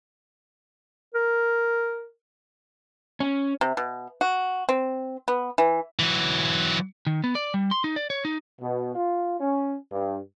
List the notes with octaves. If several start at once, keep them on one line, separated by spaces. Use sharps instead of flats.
A#4
C#4
C3
B2
F#4
C4
B3
E3
E3 F#3
D#3
B3
D5
G3
C6
D#4
D5
C#5
D#4
B2
F4
C#4
G2